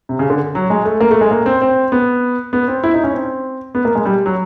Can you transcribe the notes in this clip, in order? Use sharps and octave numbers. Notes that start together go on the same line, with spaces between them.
C3
C#3
D3
F#3
G#3
A3
A#3
A3
G#3
A#3
C4
C4
B3
B3
C4
E4
D#4
C#4
C4
B3
A#3
G#3
G3
F#3